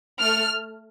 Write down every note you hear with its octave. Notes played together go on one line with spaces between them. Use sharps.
A3 F6